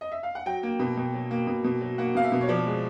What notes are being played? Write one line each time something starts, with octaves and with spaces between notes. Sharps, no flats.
D#5
E5
F5
F#5
F#3 G5
A#3
B2
B2
F#3
A#3
B2
B2
F#3
A#3 F#5
B2 F5
E5
B2
C#5
F3 D5
G#3